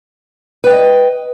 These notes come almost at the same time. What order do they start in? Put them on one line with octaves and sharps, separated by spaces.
B4 G5 D#5